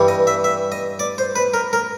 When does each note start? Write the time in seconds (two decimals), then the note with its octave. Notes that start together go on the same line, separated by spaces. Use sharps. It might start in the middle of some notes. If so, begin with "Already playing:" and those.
Already playing: G2 E3 G3
0.08 D#5
0.27 E5
0.44 E5
0.72 D#5
0.99 D5
1.18 C5
1.36 B4
1.54 A#4
1.73 A#4